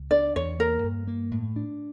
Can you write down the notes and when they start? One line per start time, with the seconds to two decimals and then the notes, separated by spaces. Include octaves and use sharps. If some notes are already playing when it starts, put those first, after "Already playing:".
Already playing: C#2
0.11 D4 D5
0.36 E2 C#5
0.59 A#3 A#4
0.84 G2
1.07 A#3
1.31 A2
1.56 D4